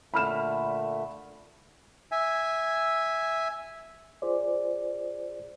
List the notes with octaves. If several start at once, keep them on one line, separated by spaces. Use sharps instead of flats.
A#2 D3 A3 B5 F6 E7
E5 G#5
F4 G#4 C5 D5